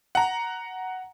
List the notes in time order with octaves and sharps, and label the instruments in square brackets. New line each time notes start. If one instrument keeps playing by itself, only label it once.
[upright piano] F#5 A#5